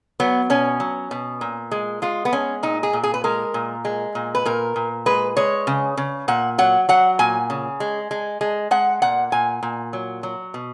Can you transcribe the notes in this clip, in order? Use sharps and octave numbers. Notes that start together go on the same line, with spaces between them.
F#3 B3
B2 C#4
F#3
B2
A#2
G#3
G#3 F4
B3
G#3 C#4
A#2 D#4
G#4
A#2
G#4
B4
G#3 A#4
A#2
G#3
A#2
B4
A#2 A#4
A#2
G#3 B4
G#3 C#5
C#3
C#3
A#2 F#5
F#3 F#5
F#3 F#5
A#2 G#5
C#3
G#3
G#3
G#3
G#3 F#5
A#2 F#5
A#2 G#5
A#2
F#3
F#3
B2